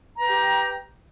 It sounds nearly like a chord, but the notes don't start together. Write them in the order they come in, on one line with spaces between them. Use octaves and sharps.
A#5 B4 G5 G4